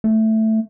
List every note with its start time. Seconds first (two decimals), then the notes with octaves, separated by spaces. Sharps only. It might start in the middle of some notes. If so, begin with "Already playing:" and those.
0.04 A3